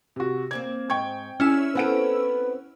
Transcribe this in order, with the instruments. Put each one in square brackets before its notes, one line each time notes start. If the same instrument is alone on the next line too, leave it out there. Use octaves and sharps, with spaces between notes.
[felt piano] C3 F#4
[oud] A#3 C4 D5 [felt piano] G#6
[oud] G#2 [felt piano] G5 C#6 G#6
[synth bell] C#4 E4 E6 [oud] D4 G#4 D5 [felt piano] F6
[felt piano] B3 F#5 D7 [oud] C4 G4 A4 [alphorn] B4